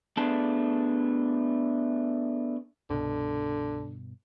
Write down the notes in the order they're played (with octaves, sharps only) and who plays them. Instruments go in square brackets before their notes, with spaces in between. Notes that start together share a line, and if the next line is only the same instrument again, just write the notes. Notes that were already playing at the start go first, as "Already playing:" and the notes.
[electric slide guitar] A3 B3 D4 G#4 A5
[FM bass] C2 [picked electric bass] G2 B2 [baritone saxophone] D3